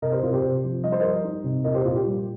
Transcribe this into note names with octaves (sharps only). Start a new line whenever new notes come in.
C3 A#4 D#5
G4 C5
C3 F4 A#4
G4 C5
C3
F3
G3 D#5
C5
G3 A#4 D#5
D#4
C3
A#2 A#4 D#5
G4 C5
A#2 F4
G4
G3